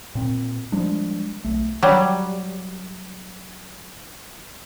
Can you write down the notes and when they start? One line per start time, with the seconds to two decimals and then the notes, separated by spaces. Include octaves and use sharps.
0.15 A#2 C4
0.72 F3 G3 G#3 D4
1.44 B1 A3
1.83 F#3 G3